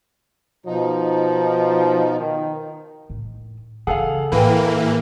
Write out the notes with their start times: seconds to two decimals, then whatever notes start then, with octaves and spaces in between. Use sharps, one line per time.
0.66 B2 F3 D#4
2.20 D#3
3.10 A2
3.87 C#3 E3 G#4 A4 F5 F#5
4.32 A2 E3 A#3 B4 G5